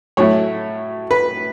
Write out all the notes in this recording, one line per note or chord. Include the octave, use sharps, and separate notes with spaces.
A2 F#3 A3 E4 C#5
B4